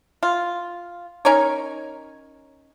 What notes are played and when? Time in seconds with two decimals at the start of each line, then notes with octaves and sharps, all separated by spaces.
0.23 F4
1.25 C#4 D#4 A#4 C#5